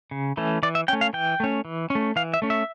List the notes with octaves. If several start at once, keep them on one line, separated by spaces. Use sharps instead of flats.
C#3
E3 A3 C#4
E3 D5
E5
A3 C#4 G5
F5
E3 G5
A3 C#4
E3
C#4
A3
E3 F5
E5
A3 C#4
E5